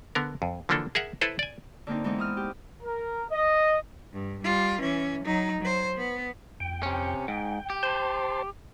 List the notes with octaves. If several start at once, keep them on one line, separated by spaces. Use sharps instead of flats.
D3 B3 A#4
F2
D3 E3 F3 A#3 D4 A4
G#4 A#4 E5 F#5
E4 A4 B4 C5
D5 G#5
D3 A#3 C4 D#4
E3 G#3 B3 C4 D#4
E4 D#6 F6
G4
A#4
D#5
G2
G3 F4
E3 C#4
F#3 D#4
F#3 C5
B3
F2 G5
C3 C#4
G#2 G5
G4
C5 A5 C6